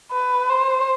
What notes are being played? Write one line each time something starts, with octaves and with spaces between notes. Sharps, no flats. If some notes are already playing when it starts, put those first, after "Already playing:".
B4
C5